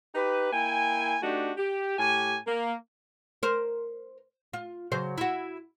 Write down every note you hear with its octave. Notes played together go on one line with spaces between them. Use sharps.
D#4 G4 B4
A#3 E4 G5 G#5
A3 D4 D#4 F#4 G4
G4
A2 G4 G#5
A#3
A#4 C5
F4
C#3 F#3 C5
E4 F#4